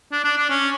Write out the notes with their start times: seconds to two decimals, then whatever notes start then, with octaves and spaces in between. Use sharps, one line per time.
0.12 D4
0.24 D4
0.37 D4
0.50 C#4